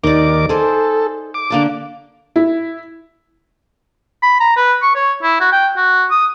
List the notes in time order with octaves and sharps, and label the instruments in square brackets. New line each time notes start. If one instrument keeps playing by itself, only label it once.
[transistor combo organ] D#2 A#4 D6 [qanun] D#4 D5
[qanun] G#4 C5 [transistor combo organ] A4
[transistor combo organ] D6
[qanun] D3 A#3 A5
[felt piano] E4
[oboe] B5
A#5
B4
C#6
C#5
E4
F#4
G5
F#4
D#6